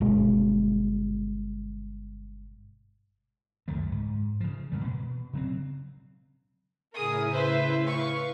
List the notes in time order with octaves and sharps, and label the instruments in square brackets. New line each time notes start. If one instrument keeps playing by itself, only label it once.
[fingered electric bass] G1 B2 G#3
[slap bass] C#2 F#2 D#3 A3
G#2
C#3 F3
G#2 E3 G3
B2
C#3 F#3 C4
[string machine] A2 C#3 E4 [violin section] G#4 A#4 D#6
[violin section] B4 C5 E5
B4 F5 C#6